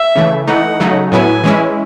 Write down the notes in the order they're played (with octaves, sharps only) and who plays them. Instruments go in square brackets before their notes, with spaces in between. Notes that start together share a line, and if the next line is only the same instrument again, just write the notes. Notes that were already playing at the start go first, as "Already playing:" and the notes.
Already playing: [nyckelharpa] E5
[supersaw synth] C#3 E3 A3
[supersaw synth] E3 A3 D#4 [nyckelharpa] F#5
[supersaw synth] C#3 F#3 A3 D#4
[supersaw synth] A2 F#3 B3 E4 [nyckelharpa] G#5
[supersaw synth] E3 G#3 C#4 E4